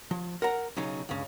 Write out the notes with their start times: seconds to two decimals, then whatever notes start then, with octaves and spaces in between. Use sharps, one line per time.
0.11 F3
0.42 A#4 F#5 A#5
0.76 B1 C#3 F#3 D#4
1.09 C#2 G2 C#3